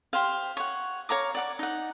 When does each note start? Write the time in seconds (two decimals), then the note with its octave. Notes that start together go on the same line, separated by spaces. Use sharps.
0.13 G4 C5 F5
0.57 C#5 F#5
1.09 C#5 F5 A#5 D6
1.35 D5 F#5 D6
1.59 D#4 F#5